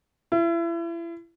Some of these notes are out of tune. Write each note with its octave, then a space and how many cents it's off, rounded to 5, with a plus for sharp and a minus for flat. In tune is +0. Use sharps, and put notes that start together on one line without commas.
E4 +35